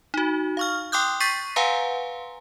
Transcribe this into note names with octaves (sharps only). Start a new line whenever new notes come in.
D#4 F#4
F5 C#6 F6
G5 C6 D6 D#6 F#6 G6
C#6 G6 A6 B6 C7 D#7
B4 F5 F#5 G#5 A#5 C6